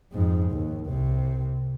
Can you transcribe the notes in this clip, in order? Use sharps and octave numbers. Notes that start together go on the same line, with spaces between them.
F2 G#2
D#2
C2 C3